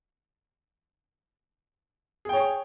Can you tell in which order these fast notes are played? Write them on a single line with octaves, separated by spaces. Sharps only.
G#4 G5 C#5